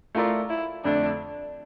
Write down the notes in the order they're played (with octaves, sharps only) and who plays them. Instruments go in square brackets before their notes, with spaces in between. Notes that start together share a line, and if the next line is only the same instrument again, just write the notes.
[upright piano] A3 E4 A#4 D5 [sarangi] F4
[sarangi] E4
[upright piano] F2 D3 A3 [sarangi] D4